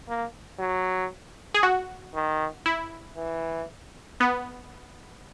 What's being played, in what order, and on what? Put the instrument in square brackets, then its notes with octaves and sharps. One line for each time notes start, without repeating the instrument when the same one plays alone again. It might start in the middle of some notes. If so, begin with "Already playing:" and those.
[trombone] A#3
F#3
[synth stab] G#4
F#4
[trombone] D#3
[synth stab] E4
[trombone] E3
[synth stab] B3